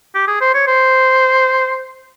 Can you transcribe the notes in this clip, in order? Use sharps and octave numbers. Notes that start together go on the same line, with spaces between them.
G4
G#4
C5
C#5
C5